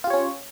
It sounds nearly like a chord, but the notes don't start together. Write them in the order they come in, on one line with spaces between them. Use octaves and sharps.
F4 G4 C#5 C#4